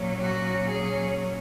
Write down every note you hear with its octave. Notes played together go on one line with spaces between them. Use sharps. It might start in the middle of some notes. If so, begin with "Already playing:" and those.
Already playing: A#2 F#3 C#4
F#4
G#4